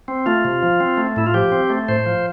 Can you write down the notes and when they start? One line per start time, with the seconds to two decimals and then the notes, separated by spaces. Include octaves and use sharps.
0.08 C4
0.26 A3 F4
0.45 C3
0.63 F3
0.80 C4
0.97 A3
1.16 A2 E4
1.27 F4
1.34 F3 G4
1.52 C4
1.70 A3
1.88 A2 C5
2.06 F3